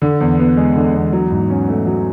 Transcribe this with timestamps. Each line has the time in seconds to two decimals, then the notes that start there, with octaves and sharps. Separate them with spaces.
0.02 D3
0.21 E2
0.39 B3
0.57 G#3
0.76 D3
0.94 E2
1.13 F#3
1.31 G#2
1.50 C#4
1.69 A3
1.87 F#3